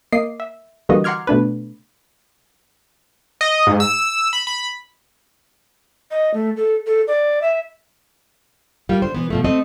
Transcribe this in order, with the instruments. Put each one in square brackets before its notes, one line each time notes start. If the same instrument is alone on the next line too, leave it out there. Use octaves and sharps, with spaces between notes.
[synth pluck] A#3 D#5 D6 C7
E5
D3 E3 G3 A#3 F#4 D#5
F#5 A#5 C6 D6 F6 G#6
B2 A3 D4 B4
[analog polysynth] D#5
G#2
E6
B5
B5
[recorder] D#5
A3
A4
A4
D5
E5
[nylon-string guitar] G3 A#3 F4
D3 C5
B2 E3 B3
B2 F3 A3
A3 C4 A4 D#5